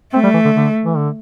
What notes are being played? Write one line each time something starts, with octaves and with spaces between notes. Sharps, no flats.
A3 C4
G3
E3
D3
D3
E3
D3